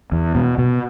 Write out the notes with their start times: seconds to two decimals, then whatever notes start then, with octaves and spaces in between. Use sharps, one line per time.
0.12 E2
0.35 B2
0.58 B2